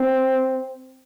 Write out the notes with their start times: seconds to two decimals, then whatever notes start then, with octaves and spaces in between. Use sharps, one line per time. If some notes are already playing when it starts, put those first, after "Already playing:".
Already playing: C4